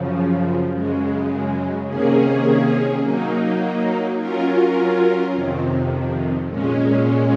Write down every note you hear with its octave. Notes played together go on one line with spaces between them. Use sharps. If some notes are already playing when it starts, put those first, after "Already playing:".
Already playing: F#2 C#3 F3
F#2 C#3 G#3
C3 D#3 A#3 C#4 G#4
F#3 A#3 D#4
F#3 C#4 F4 A#4
F2 C3 D#3
A#2 G#3 C#4